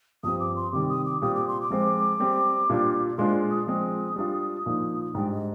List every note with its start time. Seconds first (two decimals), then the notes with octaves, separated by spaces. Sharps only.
0.23 G2 F3 C4 G4 D#6
0.40 D6
0.56 C6
0.73 C3 D#3 G3 D6
0.89 D#6
1.06 D6
1.22 A#2 G3 C4 G4 D#6
1.35 D6
1.48 C6
1.61 D6
1.70 F3 G#3 C4 F4 C5
2.20 G3 C4 G4
2.70 A#2 G3 D4 F4
3.18 A#2 G#3 D4 F4 C5 C6
3.51 D#6
3.67 F3 G#3 C4 D#6
4.16 G3 D4 F4
4.66 A#2 F3 A#3 D#4
5.15 G#2 G3 D4 G5
5.31 D#5